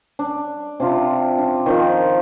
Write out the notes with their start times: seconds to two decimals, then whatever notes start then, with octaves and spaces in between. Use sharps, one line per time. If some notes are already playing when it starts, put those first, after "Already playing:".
0.19 D4
0.80 C3 D4 F4
1.38 D4
1.66 D#3 F3